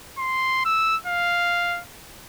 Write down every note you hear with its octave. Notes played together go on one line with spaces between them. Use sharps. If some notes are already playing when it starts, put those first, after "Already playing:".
C6
E6
F5